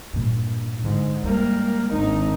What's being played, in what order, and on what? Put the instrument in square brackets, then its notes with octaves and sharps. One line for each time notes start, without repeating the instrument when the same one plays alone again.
[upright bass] G2 A#2
[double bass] G#2 [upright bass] D3 E4
[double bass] G3 A#3 [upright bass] G#3
[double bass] G#1 D#4 [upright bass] D4